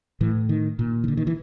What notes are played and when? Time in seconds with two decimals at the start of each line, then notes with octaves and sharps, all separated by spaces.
0.21 A2 E3
0.49 D#3
0.79 A#2
1.04 D#3
1.08 D3
1.17 D#3
1.27 E3